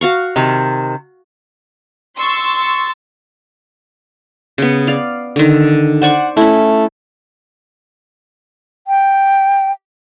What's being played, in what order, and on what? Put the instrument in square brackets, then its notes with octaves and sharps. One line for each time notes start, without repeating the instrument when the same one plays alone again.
[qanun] F#4 F5 C#6
[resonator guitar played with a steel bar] C3 D#3
[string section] C6 C#6 E6 A6
[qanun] C#3 B3
D5 F5
D3 D#3
[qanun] C5 D5 C#6 [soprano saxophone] F#5
[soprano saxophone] A3 [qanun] C#4 E4
[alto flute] G5